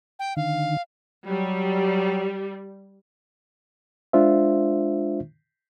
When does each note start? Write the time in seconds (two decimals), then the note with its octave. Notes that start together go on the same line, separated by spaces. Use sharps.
0.19 G5
0.36 D3 D#3 F5
1.28 F#3 G3
4.13 G#3 D4 F4 C5 E5